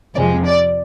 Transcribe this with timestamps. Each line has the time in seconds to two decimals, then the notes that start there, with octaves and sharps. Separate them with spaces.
0.15 F2 C3 F3 G#3 D5
0.45 D5